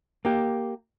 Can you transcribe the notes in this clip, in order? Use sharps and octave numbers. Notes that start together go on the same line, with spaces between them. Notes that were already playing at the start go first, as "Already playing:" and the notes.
A#3 G4